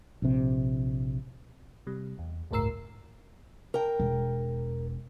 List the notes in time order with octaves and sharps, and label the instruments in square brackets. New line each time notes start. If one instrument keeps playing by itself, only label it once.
[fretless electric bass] A#1 C3
[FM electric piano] C3 G3
E2
G1 C#2 A2 A#4 E6 C7
[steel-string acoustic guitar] A#4 G5
[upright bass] E1